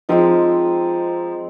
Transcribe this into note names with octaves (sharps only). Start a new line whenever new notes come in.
F3 G#3 C4 D#4